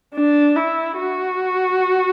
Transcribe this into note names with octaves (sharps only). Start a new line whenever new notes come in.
D4
E4
F#4